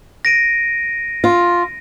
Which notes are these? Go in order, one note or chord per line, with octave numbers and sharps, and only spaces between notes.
A#6 D7 D#7
F4